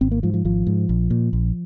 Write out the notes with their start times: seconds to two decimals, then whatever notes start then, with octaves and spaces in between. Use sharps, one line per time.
0.01 G#1 C4
0.11 A#3
0.23 G#2 F3
0.34 F3
0.45 G#1 F3
0.67 G#2
0.89 A#1
1.10 A#2
1.33 A#1